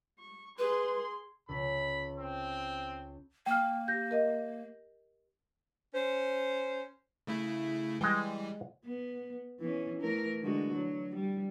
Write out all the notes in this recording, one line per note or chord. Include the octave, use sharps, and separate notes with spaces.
C#6
G#4 B4 C6
C#2 B5
C4
A#3 G5 F6
G4 G6 A#6
A#4 D#5
C#4 C5
C#3 A3 E4
E3 G3 G#3 G5
B3
E3 B3 C#4
E3 A3 A#4
D3 G#3 F#4
F#3
G3